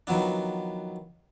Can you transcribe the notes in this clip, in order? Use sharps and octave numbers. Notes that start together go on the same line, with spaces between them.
D#3 F3 F#3 B3 D4